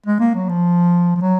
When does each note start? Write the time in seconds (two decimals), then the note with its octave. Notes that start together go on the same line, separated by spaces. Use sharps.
0.06 G#3
0.20 A#3
0.35 F#3
0.49 F3
1.16 F3
1.21 F#3